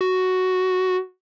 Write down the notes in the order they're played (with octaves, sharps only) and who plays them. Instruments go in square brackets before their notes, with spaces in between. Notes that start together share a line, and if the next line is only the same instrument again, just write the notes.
[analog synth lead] F#4